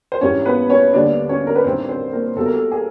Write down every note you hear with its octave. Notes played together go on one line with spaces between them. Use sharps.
C5
G#1 G2 E3 G3 C#4 C#5
B3 B4
C#4 C#5
D#2 D3 G3 B3 D4 D5
C#4 C#5
A#4
B4
A1 G2 D#3 C4 C5
C4 C5
A#3 A#4
B1 B2 G3 A4
A#4
A4
G#4